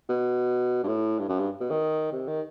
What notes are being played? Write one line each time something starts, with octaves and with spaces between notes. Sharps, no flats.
B2
G2
A2
G2
F#2
G2
B2
D#3
C3
D#3